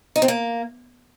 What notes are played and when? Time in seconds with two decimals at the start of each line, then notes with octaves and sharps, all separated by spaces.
0.16 D#4
0.22 C4
0.28 A#3